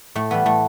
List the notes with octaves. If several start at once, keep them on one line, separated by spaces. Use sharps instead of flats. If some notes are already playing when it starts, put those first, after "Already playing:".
A2 A3
E3 G3 B3
A2 A3